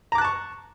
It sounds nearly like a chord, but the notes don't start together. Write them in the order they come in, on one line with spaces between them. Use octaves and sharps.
A#5 D6 F#6 A5 C#6